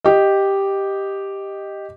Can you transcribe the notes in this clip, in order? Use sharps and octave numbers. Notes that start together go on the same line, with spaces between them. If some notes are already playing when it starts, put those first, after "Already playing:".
G4 D#5